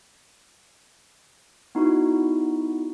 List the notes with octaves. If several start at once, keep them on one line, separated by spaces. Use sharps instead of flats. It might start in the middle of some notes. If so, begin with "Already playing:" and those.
B3 D#4 E4 F#4